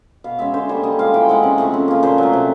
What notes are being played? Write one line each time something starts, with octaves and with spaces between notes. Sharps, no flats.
B2 F5
G#3 C#4 E5
D3 C5
G3 A#3 C#5
D3 D#5
F3 G#3 F5
E3 G5
G#3 C4 F#5
C#3
F3 A3 C4
C#3
F3 A#3
A#2 C5
F#3 A3
C3